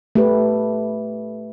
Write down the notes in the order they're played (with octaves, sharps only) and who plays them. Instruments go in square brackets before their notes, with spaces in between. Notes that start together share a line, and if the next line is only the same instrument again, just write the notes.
[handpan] A3 G4 B4